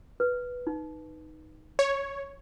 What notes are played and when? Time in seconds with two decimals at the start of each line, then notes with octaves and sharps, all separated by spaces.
0.20 B4
0.67 D#4
1.79 C#5